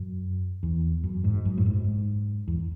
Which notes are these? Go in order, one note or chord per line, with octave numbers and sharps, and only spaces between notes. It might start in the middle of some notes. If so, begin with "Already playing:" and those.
Already playing: F#2
E2
F#2
G#2
F#2
A2
G#2
E2